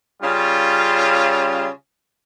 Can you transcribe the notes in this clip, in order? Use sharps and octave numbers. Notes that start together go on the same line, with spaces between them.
C#3 G3 C#4 F4